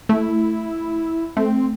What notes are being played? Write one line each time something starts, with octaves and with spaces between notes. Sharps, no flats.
A3 E4
A3 C4